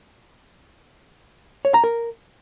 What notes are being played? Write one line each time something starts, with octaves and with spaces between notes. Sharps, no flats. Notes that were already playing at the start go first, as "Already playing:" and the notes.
C#5
A#5
A#4